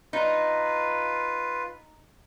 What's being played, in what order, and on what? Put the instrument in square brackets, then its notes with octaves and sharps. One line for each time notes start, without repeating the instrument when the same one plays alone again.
[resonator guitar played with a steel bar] D#4 [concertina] F4 B4